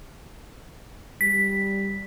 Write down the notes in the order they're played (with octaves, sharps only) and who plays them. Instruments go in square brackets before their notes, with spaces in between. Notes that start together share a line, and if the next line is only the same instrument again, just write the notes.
[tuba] G3 [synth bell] B6